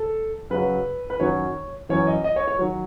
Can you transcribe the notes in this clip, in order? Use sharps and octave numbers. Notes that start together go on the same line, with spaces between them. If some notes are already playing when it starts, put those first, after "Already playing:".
Already playing: A4
F#2 C#3 F#3 B4
B4
F#2 D#3 F#3 C#5
F#2 E3 C#5
D#5
D#5
C#5
C#5
D#3 F#3